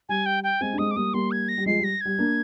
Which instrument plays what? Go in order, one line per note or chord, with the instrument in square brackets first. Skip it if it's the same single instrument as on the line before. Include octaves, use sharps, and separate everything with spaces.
[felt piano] G3 [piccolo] G#5
[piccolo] G5
G5
[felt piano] G#3 C4 [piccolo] G#5
[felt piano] D4
[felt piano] G#3 C4 [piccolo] D#6
[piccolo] D6
[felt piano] G3 A#3 [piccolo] D#6
[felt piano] G3 A#3 [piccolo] C6
[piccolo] G#6
A#6
[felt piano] G3
[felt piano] F3 G#3 [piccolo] C7
[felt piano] G3
[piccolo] A#6
[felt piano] G3 [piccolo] G#6
[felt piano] A#3 D4